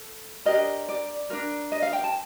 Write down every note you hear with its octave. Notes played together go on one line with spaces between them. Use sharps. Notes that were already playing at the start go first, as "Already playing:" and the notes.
Already playing: A4
D4 G4 A#4 D#5
D5
D4 F4 A#4
D#5
F5
G5
A5